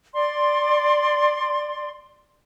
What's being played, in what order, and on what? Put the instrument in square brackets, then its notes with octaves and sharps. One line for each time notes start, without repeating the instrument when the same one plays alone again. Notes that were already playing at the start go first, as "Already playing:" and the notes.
[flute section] D5 C6